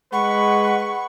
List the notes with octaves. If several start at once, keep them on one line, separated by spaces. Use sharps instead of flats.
G#3 B4 F#5 B5 C#6